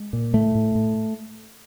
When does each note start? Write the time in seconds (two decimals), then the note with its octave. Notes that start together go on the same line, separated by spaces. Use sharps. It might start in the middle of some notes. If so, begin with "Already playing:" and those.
Already playing: G#3
0.13 A#2
0.33 A2 A3
0.55 A2
0.75 A2